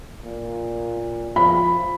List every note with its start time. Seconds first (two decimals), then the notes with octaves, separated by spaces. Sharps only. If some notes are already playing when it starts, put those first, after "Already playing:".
0.25 A#2
1.36 F3 B5